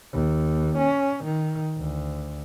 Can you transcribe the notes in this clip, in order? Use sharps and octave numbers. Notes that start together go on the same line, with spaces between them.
D#2
C#4
D#3
D2